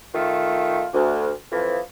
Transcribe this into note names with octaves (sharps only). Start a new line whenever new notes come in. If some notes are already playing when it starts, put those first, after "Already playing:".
D#3 A3 F4
D2
F2 E3 F3